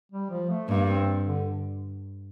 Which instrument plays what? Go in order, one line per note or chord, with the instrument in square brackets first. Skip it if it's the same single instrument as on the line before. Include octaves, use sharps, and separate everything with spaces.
[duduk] G3
F3
A3
[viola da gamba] G2 [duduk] A#3
[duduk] A#3
C4
D3